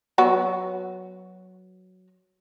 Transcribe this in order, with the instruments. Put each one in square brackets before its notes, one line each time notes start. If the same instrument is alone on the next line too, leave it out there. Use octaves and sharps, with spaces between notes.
[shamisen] F#3 B3 F#4